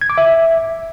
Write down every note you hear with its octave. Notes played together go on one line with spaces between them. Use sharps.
G#6
D6
E5